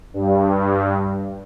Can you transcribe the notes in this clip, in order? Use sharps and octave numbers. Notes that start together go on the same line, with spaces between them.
G2